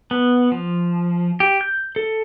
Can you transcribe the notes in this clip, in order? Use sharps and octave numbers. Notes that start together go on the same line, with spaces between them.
B3
F3
G4
G6
A4